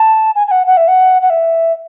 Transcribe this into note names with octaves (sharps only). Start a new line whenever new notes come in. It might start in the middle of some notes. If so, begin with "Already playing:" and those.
Already playing: A5
G#5
G#5
F#5
F#5
E5
F#5
F#5
E5